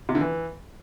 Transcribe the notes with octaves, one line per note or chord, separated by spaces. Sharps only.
C3
D3
E3